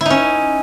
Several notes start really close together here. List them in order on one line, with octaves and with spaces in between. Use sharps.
E4 D#4 C#4